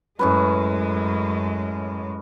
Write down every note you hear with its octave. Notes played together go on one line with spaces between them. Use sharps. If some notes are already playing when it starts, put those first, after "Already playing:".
F#2 A2 G#3 C#4 B4